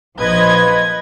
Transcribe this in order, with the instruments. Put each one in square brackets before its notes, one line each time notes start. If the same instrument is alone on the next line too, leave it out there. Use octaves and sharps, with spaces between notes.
[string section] A#1 F3 B4 D#5 G#6